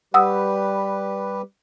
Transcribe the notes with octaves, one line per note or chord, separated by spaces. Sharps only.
G3 G4 B4 F#5 D#6 E6